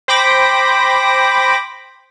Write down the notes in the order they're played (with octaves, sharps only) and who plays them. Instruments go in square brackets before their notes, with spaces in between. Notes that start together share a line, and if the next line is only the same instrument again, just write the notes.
[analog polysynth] C5 G5 B5 D6 A#6